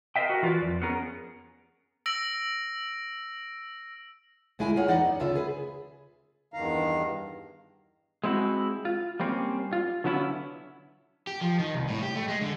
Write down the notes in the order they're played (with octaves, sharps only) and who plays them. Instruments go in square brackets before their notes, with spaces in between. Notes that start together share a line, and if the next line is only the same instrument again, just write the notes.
[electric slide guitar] A#4 C5 C#5 D#5 E5 G5
F#4 A#4
E3 F4 F#4 B4 D5
F2
B3 C#4 G#4 A#4
[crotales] E6 A#6 D7 F#7
[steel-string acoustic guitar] D2 A#2 G#3 A3 E4 G#5
A#3 F4 G#4 C#5 F#5
E2 E3 D#4 D5 D#5 F#5
F#2
D2 C#3 F4 E5
G#4 B4
[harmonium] E2 G2 D#3 F5 A#5
[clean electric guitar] G#3 C4 E4 F#4
F4
G3 A#3 C4 C#4
F4
D3 F#3 B3 C#4 E4
[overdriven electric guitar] G4
F3
D#3
C2
A2
G4
A3
G#3
D3